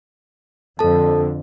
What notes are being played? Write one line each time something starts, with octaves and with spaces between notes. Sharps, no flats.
F2 D3 A4 A5